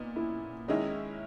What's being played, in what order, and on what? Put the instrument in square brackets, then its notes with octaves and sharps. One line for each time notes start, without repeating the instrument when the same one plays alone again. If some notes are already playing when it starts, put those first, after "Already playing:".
Already playing: [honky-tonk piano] A#2 B3 [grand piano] D#4
[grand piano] E4
[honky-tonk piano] D#3 G#3 C#4 E4 [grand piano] D#5